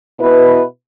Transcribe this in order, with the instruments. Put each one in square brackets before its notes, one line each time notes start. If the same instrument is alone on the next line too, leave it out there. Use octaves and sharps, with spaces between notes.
[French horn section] B2 E4 B4